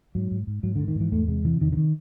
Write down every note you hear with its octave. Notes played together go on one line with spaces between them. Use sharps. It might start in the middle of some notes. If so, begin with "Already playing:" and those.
G#2 F#3
G#2
G#2
G#2 F#3
G#2 D3
D#3
G#2 E3
E2 A3
C3 G#3
C3 E3
E2 D#3
D3
D#3